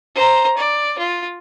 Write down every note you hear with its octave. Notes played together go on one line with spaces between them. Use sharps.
C5 A#5
D5
F4